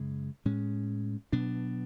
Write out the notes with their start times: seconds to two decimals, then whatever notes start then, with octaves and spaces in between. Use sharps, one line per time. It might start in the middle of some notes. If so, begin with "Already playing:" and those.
Already playing: F#2 C#3 G#3
0.45 A2 G#3 C#4
1.33 B2 F#3 B3 D4